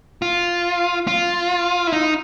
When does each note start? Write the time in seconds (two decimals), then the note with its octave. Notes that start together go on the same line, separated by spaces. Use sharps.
0.22 F4
1.07 F4
1.87 E4
1.93 D#4